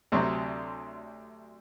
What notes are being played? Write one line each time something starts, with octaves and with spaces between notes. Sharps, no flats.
D2 C3 F#3